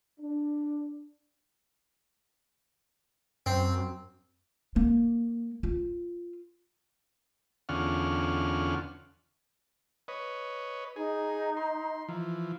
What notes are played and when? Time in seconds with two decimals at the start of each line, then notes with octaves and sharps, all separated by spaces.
0.20 D4
3.46 F#2 C4
4.76 A#3
5.63 F4
7.69 E2 D3 C#4 F4 F#5 F6
10.08 B4 C#5 D#5
10.96 D#4 G#4
11.57 C6
12.09 E3 F3